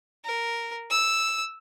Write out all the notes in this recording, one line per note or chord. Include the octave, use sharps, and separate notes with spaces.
A#4
E6